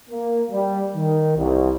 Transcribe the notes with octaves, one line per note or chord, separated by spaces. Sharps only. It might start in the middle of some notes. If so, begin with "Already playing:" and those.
A#3
G3
D#3
C2